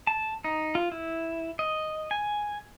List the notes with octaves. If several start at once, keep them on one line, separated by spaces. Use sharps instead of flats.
A5
D#4
F4
E4
D#5
G#5